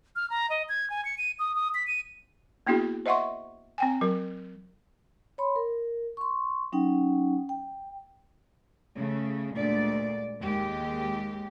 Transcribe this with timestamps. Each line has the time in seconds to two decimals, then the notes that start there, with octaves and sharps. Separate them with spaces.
0.16 F6
0.30 A#5
0.50 D#5
0.69 G#6
0.90 G#5
1.05 C#7
1.18 D#7
1.39 D#6
1.55 D#6
1.74 B6
1.87 D#7
2.67 A#3 B3 D4 E4 F#4 G#4
3.06 C5 D#5 E5 F#5 C6 C#6
3.78 C4 G5 G#5
4.01 F#3 A#4
5.38 C#5 B5 C6
5.56 A#4
6.17 C6 C#6
6.72 F#3 C#4 D#4 F#5 G5
7.49 G5
8.97 C#3 A3
9.56 D2 A#2 G#3 D5
10.41 D#2 G#3 G4